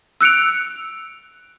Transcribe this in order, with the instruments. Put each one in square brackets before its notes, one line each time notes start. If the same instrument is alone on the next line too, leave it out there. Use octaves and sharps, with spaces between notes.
[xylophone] E6 F#6 C#7 D7 F7